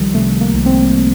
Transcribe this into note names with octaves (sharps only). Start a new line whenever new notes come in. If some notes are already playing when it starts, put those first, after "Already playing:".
Already playing: C2 D#3 F3 G3
C3 A3
A#3
C2
C4